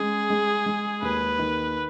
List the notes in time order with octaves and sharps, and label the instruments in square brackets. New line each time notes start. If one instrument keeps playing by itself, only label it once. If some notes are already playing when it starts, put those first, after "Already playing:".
Already playing: [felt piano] G#3 C#4 [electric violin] G#4
[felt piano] G#3
G#3
[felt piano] D#2 [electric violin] B4
[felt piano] D#3